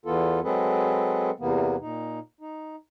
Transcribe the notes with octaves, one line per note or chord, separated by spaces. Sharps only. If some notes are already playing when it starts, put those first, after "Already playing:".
E2 E3 B3 F4 A4
F#3 G#3 C4 G#4 A4 B4
E2 C3 E3 A#3 B3
A#2 D#4
D#4